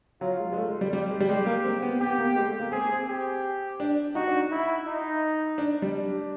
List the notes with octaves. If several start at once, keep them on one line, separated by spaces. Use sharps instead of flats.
F#3 F4
G#3
G#3
A3
G#3
G3
G3 G4
G#3
G3
G#3 G4
A#3
C4
B3
B3 G4
B3
A#3
G#3
A3
A#3
C4 G#4
C4
G4
D4
D#4 F#4
D4
D#4 E4
D#4
D4
G3
D4